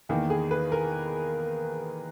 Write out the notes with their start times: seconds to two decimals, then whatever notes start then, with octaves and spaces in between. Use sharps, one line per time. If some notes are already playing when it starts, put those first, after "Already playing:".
0.09 E2 D#3 A#3
0.30 G#4
0.51 B4
0.72 A#4